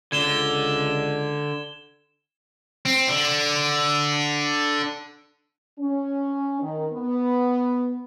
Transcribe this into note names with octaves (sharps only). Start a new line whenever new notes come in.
C#2 D3 G#6 E7 G7
C4
D3
C#4
D#3
B3